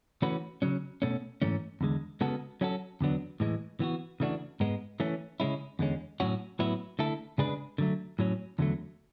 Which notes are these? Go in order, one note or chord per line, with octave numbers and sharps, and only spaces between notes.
E3 A3 C#4 F#4 B4
C#3 F#3 C#4
B2 A3 C#4
G#2 E3 A3 C#4
E2 D3 G#3
C#3 G#3 B3 F#4 A4
F#3 C#4 F#4 A4
E2 D3 F#3 B3 D4
A2 E3 G#3
E3 B3 F#4
C#3 E3 A3 D4 F#4
G#2 G#3 B3
E3 A3 C#4
C#3 G#3 C#4 E4
E2 D3 G#3 C#4
A2 F#3 C#4 F#4
A2 F#3 B3 E4
D3 A3 E4 A4
C#3 G#3 D4 G#4 B4
D3 F#3 A3
A2 F#3 C#4
E2 D3 F#3 A3